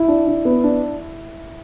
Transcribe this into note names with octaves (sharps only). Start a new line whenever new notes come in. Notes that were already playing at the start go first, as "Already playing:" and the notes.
Already playing: E4
D4
D4
B3
D4